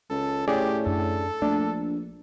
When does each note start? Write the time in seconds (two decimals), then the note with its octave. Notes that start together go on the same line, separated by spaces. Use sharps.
0.10 C#2 A4
0.48 A2 C#4 G4 G#4 D5
0.86 F#2 D4 A4
1.42 A#1 A3 D4